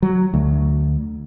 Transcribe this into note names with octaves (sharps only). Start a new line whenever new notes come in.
F#3
D2